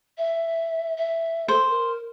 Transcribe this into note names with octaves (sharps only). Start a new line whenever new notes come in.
E5
E5
A4 C5
A#4